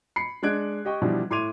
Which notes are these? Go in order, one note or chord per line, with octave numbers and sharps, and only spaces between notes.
B5 C7 C#7
G#3 D4 F#6 G#6 D7
G4 D#5 G5 C#6
B2 E3 F3 G3 D4
A2 C6 D6 G#6 D#7 F7